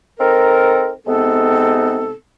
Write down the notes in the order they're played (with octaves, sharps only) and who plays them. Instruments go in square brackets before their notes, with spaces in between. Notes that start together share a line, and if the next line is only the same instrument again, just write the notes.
[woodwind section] C4 D#4 A4 A#4
C3 G#3 B3 C4 D#4 A4